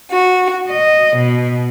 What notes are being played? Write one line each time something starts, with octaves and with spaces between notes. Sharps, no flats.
F#4
D#5
B2